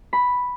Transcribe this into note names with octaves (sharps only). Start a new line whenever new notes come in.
B5